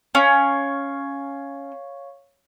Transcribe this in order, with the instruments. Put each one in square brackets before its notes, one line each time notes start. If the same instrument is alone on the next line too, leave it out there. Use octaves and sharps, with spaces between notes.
[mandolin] C#4 [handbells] C#5 F5 C#6